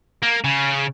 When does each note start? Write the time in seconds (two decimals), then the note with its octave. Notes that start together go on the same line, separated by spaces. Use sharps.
0.22 A#3
0.44 C#3